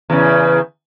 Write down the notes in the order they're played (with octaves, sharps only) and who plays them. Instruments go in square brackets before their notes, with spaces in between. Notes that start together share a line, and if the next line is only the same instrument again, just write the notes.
[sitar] E2 C#3